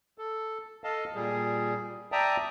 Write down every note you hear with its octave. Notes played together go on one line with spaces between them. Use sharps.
A4
A4 D#5 F5 A5
A#2 G3 G#4
D5 E5 G5 A5 A#5 D#6